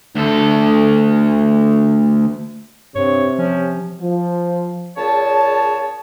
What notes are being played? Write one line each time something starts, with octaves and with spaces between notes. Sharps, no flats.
D2 A4
G2 C3 C#5
F3 C#4
F3
A#2 C#3 G#4 C#5 A5